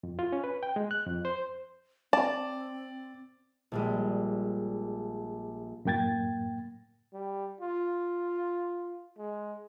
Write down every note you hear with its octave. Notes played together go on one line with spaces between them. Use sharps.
F2
F4
C#4
B4
G5
G#3
F#6
F2
C5
C4 D5 A5
A#1 G3 G#3
F#2 A2 A#3 G5 G#6 A6
G3
F4
G#3